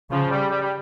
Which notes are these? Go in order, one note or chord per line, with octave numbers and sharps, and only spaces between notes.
C#3 F3
G3
G3
G3